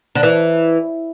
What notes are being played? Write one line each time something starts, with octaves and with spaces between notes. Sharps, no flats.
D3
E3